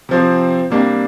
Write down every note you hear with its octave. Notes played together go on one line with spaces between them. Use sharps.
C3 F3 C4
C3 G3 A#3 D4